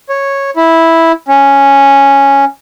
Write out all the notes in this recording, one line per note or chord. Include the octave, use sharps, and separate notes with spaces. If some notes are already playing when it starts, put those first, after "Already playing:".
C#5
E4
C#4